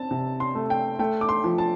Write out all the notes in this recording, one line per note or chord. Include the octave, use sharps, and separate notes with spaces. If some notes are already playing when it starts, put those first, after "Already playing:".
Already playing: C4 A5
C3
C6
A3
G5
A3 G5
D6
C6
F3
A5